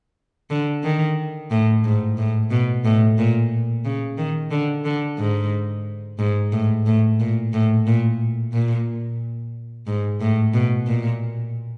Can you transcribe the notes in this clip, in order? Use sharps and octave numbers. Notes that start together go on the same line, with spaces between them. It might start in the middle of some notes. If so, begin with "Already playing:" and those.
D3
D#3
A2
G#2
A2
B2
A2
A#2
C#3
D#3
D3
D3
G#2
G#2
A2
A2
A#2
A2
A#2
A#2
G#2
A2
B2
A#2